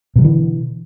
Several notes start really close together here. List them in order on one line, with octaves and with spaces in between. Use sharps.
B2 F#3 D3 E3